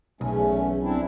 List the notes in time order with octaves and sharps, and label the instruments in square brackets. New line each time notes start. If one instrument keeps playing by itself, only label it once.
[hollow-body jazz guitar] B1 [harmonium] E2 A3 C#4
[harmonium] C4 D4 E4